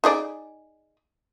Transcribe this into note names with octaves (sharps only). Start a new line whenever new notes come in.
D#4 G#4 D5